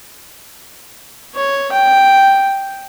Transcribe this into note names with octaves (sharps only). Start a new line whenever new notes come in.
C#5
G5